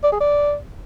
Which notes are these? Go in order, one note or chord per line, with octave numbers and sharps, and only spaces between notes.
D5
G#4
D5